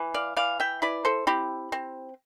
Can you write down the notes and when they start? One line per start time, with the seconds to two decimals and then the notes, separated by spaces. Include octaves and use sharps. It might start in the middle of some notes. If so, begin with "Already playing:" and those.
Already playing: E3
0.14 D5 F5
0.36 E3 D5 F5
0.60 E5 G5
0.82 E4 B4 D5
1.05 A4 C5
1.27 C4 E4 G4
1.72 C4